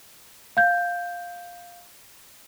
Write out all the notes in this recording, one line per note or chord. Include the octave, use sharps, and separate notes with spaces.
F5 G6